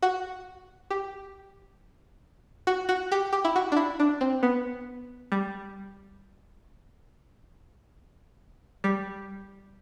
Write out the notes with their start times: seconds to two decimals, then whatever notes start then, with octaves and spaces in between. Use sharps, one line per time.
0.02 F#4
0.90 G4
2.67 F#4
2.89 F#4
3.12 G4
3.33 G4
3.45 E4
3.56 F#4
3.72 D4
3.77 E4
4.00 D4
4.21 C4
4.43 B3
5.32 G3
8.84 G3